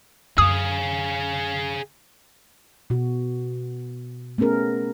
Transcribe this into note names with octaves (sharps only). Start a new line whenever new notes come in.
F#2 D3 G#4 F5 D#6
B2 F#4
A3 B3 C#4 G#4 A#4